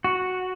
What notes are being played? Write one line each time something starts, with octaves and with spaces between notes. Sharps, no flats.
F#4